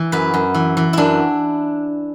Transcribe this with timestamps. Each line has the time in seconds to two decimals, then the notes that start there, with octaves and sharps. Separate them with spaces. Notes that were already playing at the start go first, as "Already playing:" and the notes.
Already playing: E3
0.12 F#2 B4
0.34 F#2
0.54 E3
0.77 E3
0.93 F#2 D4 E4